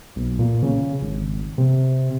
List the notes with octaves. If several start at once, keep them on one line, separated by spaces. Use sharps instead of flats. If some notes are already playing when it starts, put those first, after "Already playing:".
B1
A#2
C#3
G#1
C3